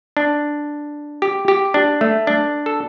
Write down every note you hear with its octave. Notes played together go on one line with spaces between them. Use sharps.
D4
G4
G4
D4
A3
D4
A4